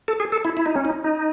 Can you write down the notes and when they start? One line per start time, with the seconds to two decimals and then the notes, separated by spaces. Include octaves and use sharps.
0.08 A4
0.20 G#4
0.32 A4
0.45 E4
0.57 E4
0.66 D#4
0.76 C#4
0.85 D#4
1.04 D#4